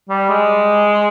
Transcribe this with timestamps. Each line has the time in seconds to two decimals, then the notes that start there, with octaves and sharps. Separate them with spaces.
0.09 G3
0.29 G#3